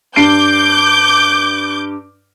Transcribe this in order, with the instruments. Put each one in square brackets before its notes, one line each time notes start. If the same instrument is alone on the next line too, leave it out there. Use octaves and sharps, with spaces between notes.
[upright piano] G2 C7 D7 [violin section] D6 G6